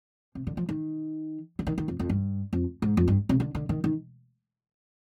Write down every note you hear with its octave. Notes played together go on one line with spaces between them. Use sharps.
C3
D3
F3
D#3
D3
D#3
D#3
F2
F2
G2
F2
G#2
F2
G2
C3
D3
D3
D#3
D#3